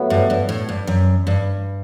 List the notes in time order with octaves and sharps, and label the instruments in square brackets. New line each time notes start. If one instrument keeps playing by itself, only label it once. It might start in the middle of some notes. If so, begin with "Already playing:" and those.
Already playing: [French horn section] A2 F#3 B3 E4
[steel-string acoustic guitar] G2
G2
A2
G2
F#2
G2